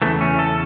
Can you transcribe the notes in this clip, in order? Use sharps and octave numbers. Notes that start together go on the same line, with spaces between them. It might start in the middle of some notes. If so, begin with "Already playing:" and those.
E2 C#3 E3 A3
C#4
A4